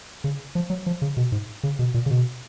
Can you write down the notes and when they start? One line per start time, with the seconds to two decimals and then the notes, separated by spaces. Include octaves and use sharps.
0.24 C#3
0.55 F3
0.70 F#3
0.86 F3
1.02 C#3
1.17 B2
1.32 G#2
1.63 C#3
1.79 B2
1.94 A#2
2.06 C#3
2.10 B2